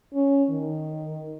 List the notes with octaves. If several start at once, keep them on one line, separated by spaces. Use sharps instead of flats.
C#4
D#3